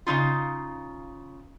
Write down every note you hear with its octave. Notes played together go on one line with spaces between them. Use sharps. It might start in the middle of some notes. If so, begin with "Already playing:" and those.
C#3 G#3 D#4 F4